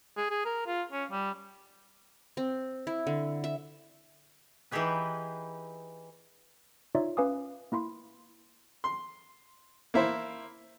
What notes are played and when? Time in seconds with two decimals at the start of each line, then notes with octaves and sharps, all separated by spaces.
0.17 G#4
0.30 G#4
0.45 A#4
0.66 F4
0.92 C#4
1.11 G3
2.37 C4
2.87 E4
3.07 D3
3.44 E5
4.71 E3 D#4 E4 G4 G#4 B4
6.95 D#4 F4 C#5 D5 E5
7.17 C#4 B4 F5 G#5 D6 D#6
7.72 A#3 E4 B5 C6
8.84 C6
9.94 A#3 E4 C5